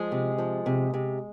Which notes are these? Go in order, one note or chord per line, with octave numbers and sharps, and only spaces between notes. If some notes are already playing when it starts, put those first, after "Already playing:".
Already playing: F3 G#3 G#4
C3
F3
C3
C3